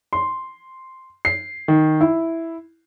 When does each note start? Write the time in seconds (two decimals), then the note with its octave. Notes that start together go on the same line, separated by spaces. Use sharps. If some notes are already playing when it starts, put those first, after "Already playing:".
0.13 C6
1.25 C7
1.68 D#3
2.01 E4